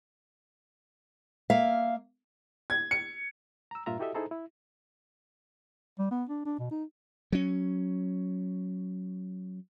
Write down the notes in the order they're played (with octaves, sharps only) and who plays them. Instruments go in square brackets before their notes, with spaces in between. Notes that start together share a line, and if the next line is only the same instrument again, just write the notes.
[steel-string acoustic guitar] A#3 E5 F5
[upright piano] G#6
C#7
[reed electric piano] A#5 E6
G2 A#2 F4 E5 A#5
E4 F#4 G4 A4 D#5 E5
D#4 E4 G#4 A4 C5 A#5
E4
[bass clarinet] G3
B3
D4
D4
B2
D#4
[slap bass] F#3 C#4